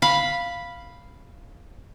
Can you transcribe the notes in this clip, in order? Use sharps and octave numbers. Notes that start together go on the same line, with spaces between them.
F5 B5